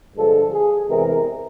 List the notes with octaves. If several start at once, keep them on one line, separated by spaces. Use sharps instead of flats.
G2 D3 F3 G#3 A4
G#4
E2 C3 E3 G#3 A#4